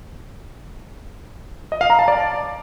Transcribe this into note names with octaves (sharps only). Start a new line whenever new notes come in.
D#5
F5
A#5
A5
D5